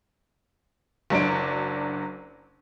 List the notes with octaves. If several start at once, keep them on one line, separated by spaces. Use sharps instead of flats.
F#1 F#3 D4 D7